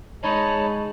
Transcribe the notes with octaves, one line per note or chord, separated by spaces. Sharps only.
G#3 D#4 C#5 A5 B5